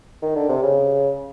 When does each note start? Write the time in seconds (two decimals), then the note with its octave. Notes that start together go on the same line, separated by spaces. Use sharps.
0.22 D#3
0.36 D3
0.49 C3
0.62 C#3